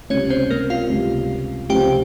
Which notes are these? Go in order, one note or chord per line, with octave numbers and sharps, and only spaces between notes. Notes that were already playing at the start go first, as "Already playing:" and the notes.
C#2 C3 G3 C#4 C#5
C4 C5
A#3 A#4
F4 F5
C#2 C3 G3
C#2 C3 F3 C4 G4 G5